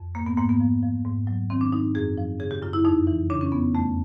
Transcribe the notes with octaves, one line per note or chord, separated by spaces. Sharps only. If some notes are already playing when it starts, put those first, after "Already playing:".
Already playing: F2
G#2 A#3
B3
G#2 A#3
B3
F3
F3
G#2
F#3
D#3 C4
D4
G#2 D#4
F#2 G#4
F3
C#3 G#4
G4
F#2 F4
E4
F2 D#4
E3
C#3 D4
C#4
F2 B3
E2 A3